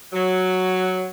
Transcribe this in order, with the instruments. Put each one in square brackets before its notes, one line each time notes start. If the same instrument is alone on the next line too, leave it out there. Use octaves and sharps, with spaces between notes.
[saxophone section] F#3